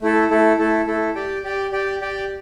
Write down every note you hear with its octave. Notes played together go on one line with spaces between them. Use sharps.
A3 E4 A4
A3 E4 A4
A3 E4 A4
A3 E4 A4
G4 D5 G5
G4 D5 G5
G4 D5 G5
G4 D5 G5